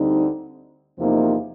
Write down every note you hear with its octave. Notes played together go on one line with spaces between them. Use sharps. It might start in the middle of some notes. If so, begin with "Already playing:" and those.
Already playing: D2 D3 G3 C4 D#4
E2 C3 F3 A#3 D#4